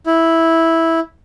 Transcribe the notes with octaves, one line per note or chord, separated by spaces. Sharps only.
E4